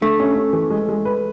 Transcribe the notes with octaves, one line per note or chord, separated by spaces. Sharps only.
D3 A3
C#4
C#4
E3
G#3
G#3
B4